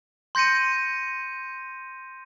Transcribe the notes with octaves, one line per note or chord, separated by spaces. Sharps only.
C6 G6 A#6 C#7 D#7